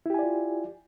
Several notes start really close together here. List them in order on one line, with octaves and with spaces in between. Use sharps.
E4 G4 G#5 D5 F4